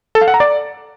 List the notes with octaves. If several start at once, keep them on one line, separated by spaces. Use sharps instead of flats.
A4
F5
F#5
A#5
D5